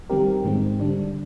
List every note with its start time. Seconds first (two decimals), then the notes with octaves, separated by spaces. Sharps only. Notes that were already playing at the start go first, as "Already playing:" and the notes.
0.10 D#3 G3 C4 G4 A#4
0.44 G#2 D#3 G#3 C4
0.80 D3 G3 D4